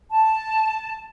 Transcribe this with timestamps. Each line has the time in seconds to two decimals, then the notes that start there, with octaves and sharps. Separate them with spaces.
0.10 A5